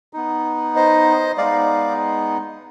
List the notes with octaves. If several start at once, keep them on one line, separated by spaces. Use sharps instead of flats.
B3 D#4
C5 D#5
G#3 B3 D#4 D5 F5